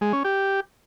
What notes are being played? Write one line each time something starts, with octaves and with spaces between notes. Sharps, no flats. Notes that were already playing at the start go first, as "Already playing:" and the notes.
G#3
C#4
G4